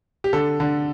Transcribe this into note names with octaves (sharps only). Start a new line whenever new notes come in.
G4
D3 A4
D3